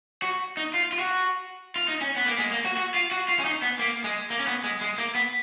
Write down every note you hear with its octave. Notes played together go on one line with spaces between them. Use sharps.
F#4
D#4
F4
F4
F#4
F4
D#4
C#4
B3
A#3
G#3
A#3
F#4
F#4
F4
F#4
F4
C#4
D#4
B3
A#3
G#3
A#3
C#4
B3
G#3
G#3
A#3
B3